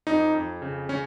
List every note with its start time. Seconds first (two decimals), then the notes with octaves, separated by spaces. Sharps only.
0.07 F2 D#4
0.34 F2
0.62 C#3
0.89 C#3 C#4